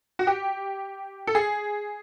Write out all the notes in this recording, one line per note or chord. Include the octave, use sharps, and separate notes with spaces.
F#4
G4
A4
G#4